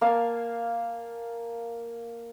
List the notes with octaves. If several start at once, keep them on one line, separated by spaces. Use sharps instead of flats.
A#3 F5 G#5 A5